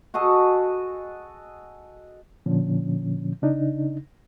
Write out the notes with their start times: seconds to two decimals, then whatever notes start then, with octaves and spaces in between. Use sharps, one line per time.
0.14 F#4 G#4 A4 D#5
2.46 A#2 D3 F3 C#4
3.42 C#3 D4 D#4